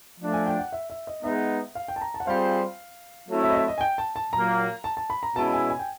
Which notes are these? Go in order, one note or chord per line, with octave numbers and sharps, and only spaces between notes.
F3 A3 D4
G#5
G5
F#5
E5
E5
D#5
G#3 B3 D#4 E5
F5
G5
A5
A#5
A5
F#5
G3 C4 F4 G#4 C5 F5
F#3 A3 C4 E4
E5
D#5
E5
D#5
G#5
G5
A5
A5
A#2 F#3 A#3 A#5
A5
A5
B5
A#5
B2 G#3 C#4 E4 A5
G#5
G#5
G5